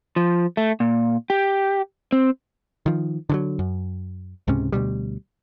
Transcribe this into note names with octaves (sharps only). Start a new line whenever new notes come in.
F3
A3
A#2
G4
C4
D#3 F3
D3 D#3 F#3
F#2
C#2 G#2 C3 C#4
D2 B2 G3